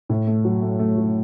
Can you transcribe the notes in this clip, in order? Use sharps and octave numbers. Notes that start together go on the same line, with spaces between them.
A2
A3
F#3
A3
A3
F#3